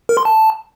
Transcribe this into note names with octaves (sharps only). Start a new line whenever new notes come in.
A#4
C6
A5